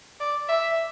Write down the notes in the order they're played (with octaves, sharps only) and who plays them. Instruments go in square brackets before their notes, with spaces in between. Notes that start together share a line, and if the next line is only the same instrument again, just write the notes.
[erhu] D5
E5